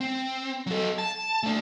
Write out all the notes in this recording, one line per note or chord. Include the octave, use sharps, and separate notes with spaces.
C4
F#3 A4
A5
A3 D4